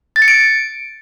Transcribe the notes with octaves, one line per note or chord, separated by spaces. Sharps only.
A6
C#7
D7